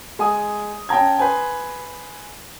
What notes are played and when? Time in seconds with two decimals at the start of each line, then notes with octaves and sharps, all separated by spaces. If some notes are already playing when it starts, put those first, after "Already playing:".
0.19 G#3 G#5 D#6
0.89 C#4 G5 A5 A#5 G#6
1.19 B4 C5 G#5